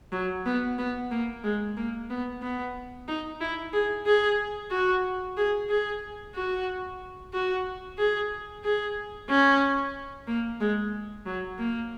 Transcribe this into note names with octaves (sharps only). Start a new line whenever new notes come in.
F#3
B3
B3
A#3
G#3
A#3
B3
B3
D#4
E4
G#4
G#4
F#4
G#4
G#4
F#4
F#4
G#4
G#4
C#4
A#3
G#3
F#3
A#3